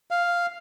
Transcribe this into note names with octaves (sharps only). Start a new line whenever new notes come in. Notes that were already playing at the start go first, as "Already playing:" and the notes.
F5